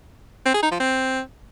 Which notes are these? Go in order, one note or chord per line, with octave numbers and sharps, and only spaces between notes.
C4
G#4
D#4
F3
C4